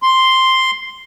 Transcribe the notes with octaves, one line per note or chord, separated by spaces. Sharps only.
C6